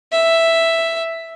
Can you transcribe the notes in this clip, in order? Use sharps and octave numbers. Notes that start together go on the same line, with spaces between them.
E5